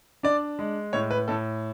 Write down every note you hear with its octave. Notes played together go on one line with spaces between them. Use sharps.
D4 D5
G#3
A2 C#5
B4
A2 A4